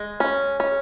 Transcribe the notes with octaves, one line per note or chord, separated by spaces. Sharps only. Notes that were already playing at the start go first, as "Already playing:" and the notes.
Already playing: G#3
C#4
C#4